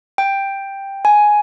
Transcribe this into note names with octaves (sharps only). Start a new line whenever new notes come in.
G5
G#5